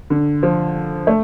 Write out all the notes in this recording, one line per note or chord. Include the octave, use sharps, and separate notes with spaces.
D3
F3
A3